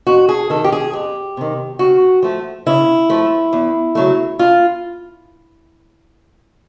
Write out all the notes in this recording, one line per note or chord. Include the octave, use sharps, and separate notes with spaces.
F2 F#4
G#4
C3 D#3 A4
G4
G#4
F2 G4
C3 D#3
C#3 F#4
F3 A3
C#3 E4
F3 A3
E2
C#3 F#3 A3
F4